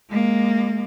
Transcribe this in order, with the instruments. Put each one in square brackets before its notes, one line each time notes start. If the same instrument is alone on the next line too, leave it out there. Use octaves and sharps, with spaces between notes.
[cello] G#3 A#3